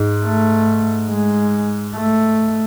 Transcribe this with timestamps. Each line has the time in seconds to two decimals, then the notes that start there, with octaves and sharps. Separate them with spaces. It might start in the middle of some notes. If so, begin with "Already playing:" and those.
Already playing: G#2
0.25 A3
1.09 G#3
1.95 A3